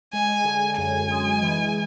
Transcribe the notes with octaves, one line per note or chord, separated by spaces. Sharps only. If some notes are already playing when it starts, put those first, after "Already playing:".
G#3 G#5
D3
F#2 G#5
G#3
E3